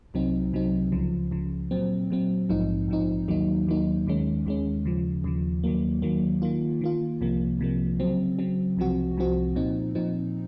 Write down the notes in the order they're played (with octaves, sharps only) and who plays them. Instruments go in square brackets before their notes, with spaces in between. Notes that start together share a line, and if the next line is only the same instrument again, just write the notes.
[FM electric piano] C2 C3 F#3 C4 D#4
C2 C3 F#3 C4 D#4
C#2 C#3 F3
C#2 C#3 F3
A#2 F#3 C4
A#2 F#3 C4
A#1 G#2 F3 C4 D#4
A#1 G#2 F3 C4 D#4
D#2 D#3 F#3 A#3 D#4
D#2 D#3 F#3 A#3 D#4
D#2 D#3 G#3 C#4
D#2 D#3 G#3 C#4
D#2 C#3 F3
D#2 C#3 F3
D#2 D#3 F#3 A#3
D#2 D#3 F#3 A#3
D#3 A#3 F4
D#3 A#3 F4
C2 C3 F3 A#3
C2 C3 F3 A#3
C#3 F#3 C4
C#3 F#3 C4
C2 C3 F3 C4 F#4
C2 C3 F3 C4 F#4
A#2 F3 C4 D#4
A#2 F3 C4 D#4